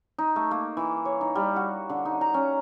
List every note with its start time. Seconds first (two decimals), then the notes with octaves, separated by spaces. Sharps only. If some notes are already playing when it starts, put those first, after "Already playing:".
0.18 D#4
0.36 A3
0.51 A#3
0.77 E3
1.05 C#5
1.21 D#4
1.35 G3
1.56 F#4
1.90 D3
2.05 D#4
2.21 A#5
2.34 C#4